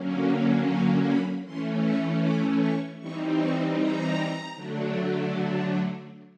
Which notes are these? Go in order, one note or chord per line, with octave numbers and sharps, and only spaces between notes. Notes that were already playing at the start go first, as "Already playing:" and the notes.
Already playing: D3 F#3 A#3 C#4
F5
B5
E3 A3 C#4 C6
C#6
D6
C#6
E3 G3 C4 D#4 C#6
C#6
A#5
D3 F#3 A3 D4